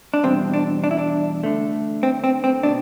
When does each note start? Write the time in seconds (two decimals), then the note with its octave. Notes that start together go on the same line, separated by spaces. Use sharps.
0.14 D4
0.23 E2 B2 G3 C4
0.54 D4
0.84 D4
0.91 E4
0.98 D4
1.43 D2 D3 A3
2.03 C4
2.24 C4
2.44 C4
2.63 B2 D4